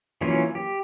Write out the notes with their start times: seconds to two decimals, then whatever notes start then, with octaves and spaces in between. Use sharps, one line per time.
0.21 E3 F#3 A#3 C#4 F4
0.55 G4